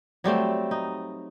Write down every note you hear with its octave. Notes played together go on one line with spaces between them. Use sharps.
F#3 G3 A3 C4
D#4